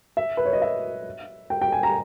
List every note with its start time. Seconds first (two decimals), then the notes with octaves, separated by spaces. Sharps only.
0.17 E5
0.37 B4
0.45 C#5
0.53 D#5
0.62 E5
1.50 G5
1.61 G5
1.72 G#5
1.83 A#5